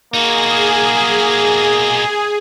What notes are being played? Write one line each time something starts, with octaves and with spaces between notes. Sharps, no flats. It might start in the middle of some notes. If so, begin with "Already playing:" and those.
A#3 D#4 F#4 G#4